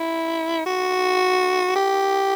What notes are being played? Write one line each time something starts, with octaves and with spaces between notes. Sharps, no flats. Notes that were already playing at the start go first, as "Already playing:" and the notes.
Already playing: E4
F#4
G4